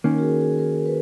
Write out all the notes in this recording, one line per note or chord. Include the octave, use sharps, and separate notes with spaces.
D#3 A#3 C#4 A#4
F#4
G#4
G#4
A#4
B4